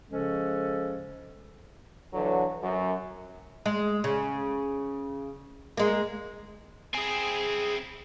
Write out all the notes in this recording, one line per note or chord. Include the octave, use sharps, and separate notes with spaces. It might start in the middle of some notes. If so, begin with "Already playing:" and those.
C#3 F3 G#3 C#4 A4
D3 E3 F#3
F#2
G#3
C#3
G#3 A#3
C4 E4 G#4 G#5